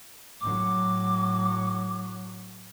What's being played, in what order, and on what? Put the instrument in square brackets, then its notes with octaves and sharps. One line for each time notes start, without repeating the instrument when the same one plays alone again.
[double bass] A2 F#3 [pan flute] D6